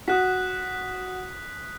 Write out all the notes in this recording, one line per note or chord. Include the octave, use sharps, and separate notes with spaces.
F#4 D#6 F#6 B6